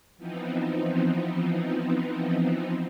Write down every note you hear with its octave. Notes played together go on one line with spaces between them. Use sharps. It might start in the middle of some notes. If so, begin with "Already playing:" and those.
E3 F3 B3 C4 D#4